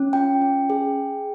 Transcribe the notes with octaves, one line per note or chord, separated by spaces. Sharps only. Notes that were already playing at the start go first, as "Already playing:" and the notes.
Already playing: C#4
F4 G5
C#4
G#4